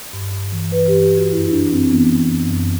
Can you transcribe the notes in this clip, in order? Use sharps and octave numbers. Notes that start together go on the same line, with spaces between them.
G2
G2
E3
E3 B4
G2 G4
G4
E3
F#4
F#2 E4
E4
E3 D4
F#2 C4
E3 B3
E3
F#2
F#2